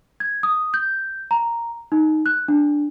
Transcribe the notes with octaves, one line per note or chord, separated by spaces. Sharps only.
G#6
D#6
G6
A#5
D#4
F#6
D4